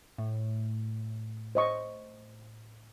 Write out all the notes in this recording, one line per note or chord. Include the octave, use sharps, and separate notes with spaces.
A2
C5 D#5 C#6